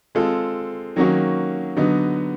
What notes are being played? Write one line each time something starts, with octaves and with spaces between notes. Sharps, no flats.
G#3 C4 F4 A4
D#3 F#3 A#3 C#4 F#4
D3 F#3 B3 D#4